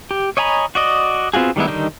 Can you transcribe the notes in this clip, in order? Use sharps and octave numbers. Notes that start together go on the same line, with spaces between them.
G4
C#5 D#5 G#5 A#5 B5
F#4 D5 D#5
B3 C4 F4 F#4 G#4
D#3 G3 G#3 B3 E4
D3 D#3 G3 D#4